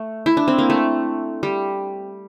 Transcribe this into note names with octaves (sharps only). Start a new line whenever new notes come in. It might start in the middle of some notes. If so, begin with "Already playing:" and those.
Already playing: A3
E4
D4
C4
A#3
A3
G3